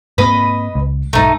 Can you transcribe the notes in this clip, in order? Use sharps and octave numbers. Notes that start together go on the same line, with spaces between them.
G#2 A#3 C4 B4 D#5 B5
C#2
B1 G#2 A3 D#4